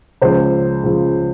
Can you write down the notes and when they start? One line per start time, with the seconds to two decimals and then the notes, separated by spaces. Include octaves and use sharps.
0.22 C#2 C#3 F3 C5
0.83 C#2 C#3 F3